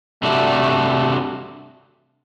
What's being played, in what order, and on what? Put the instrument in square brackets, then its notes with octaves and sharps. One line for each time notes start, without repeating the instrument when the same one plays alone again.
[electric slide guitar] C3 G3 D4 F#4 [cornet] A3
[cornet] A3